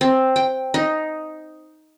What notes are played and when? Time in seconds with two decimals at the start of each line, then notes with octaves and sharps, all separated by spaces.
0.01 C4
0.36 G5
0.74 D#4